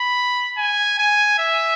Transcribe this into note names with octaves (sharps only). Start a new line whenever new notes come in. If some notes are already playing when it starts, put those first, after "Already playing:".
Already playing: B5
G#5
G#5
E5